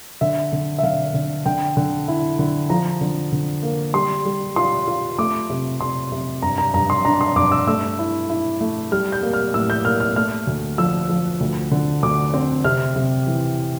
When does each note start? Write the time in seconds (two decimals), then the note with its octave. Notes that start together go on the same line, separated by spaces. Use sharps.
0.21 D3 E5
0.52 D3
0.79 E5
0.83 D3 F5
1.14 D3
1.46 D3 G5
1.77 D3
2.08 E4
2.39 D3
2.70 F3 A#5
3.01 D3
3.32 D3
3.63 A#3
3.94 G3 C6
4.25 G3
4.56 F4 C6
4.87 F4
5.18 A3 D6
5.50 C3
5.81 C3 C6
6.12 C3
6.42 G2 A#5
6.58 A#5
6.74 G2 A#5
6.90 C6
7.05 D4 A#5
7.21 C6
7.36 G2 D6
7.52 E6
7.67 A3 E6
7.99 E4
8.29 E4
8.61 A3
8.92 G3 F6
9.12 G6
9.23 A#3
9.33 F6
9.54 A2 E6
9.70 G6
9.85 A#3 F6
10.00 F6
10.16 A3 F6
10.47 D2
10.78 F3 E6
11.09 F3
11.40 D2
11.71 D3
12.03 D2 D6
12.34 C4
12.64 C3 F6
12.96 C3
13.27 E3